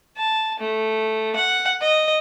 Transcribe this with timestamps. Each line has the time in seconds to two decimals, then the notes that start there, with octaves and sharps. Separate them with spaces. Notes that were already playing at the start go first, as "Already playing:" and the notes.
0.17 A5
0.59 A3
1.36 F#5
1.81 D#5